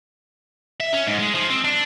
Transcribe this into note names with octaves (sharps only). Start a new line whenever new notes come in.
E5
C#4
G#2
G#3
F3
C4
D4